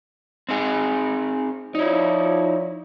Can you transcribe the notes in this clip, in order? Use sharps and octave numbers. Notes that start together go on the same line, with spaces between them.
C4 D#4 G#4
F3 D#4 E4 C#5 D5